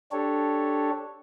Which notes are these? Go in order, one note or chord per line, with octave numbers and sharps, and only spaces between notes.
D4 G4 A4 C#5